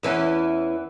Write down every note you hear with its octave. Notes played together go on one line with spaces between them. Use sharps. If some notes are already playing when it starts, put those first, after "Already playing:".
E2 E3 C#4